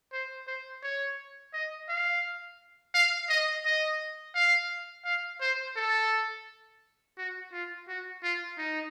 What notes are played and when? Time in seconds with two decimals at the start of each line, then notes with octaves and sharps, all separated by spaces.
0.13 C5
0.47 C5
0.83 C#5
1.54 D#5
1.89 F5
2.94 F5
3.29 D#5
3.65 D#5
4.35 F5
5.05 F5
5.41 C5
5.76 A4
7.17 F#4
7.53 F4
7.88 F#4
8.23 F4
8.58 D#4